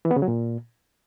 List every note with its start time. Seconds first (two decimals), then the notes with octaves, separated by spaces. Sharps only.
0.05 E3
0.11 B3
0.16 C#3
0.22 F#3
0.28 A#2